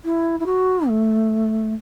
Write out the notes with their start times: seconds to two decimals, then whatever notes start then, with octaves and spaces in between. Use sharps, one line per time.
0.04 E4
0.40 E4
0.46 F#4
0.88 A3